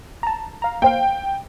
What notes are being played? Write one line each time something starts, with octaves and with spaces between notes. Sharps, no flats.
A5 A#5
F5 A#5
A#3 C5 F5 G5